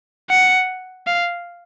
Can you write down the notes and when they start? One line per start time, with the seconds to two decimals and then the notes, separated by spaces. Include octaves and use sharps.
0.30 F#5
1.07 F5